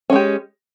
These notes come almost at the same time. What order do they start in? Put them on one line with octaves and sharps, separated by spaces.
C#4 G#3 G4